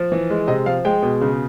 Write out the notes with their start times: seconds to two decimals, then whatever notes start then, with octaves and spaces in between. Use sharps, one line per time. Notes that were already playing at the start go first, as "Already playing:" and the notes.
Already playing: F3
0.12 E3
0.30 G#3
0.48 C3 D#5
0.66 F3 F5
0.85 G#3 G5
1.03 B2
1.21 C#3